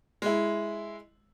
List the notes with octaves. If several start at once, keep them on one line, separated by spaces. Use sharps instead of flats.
G#3 E4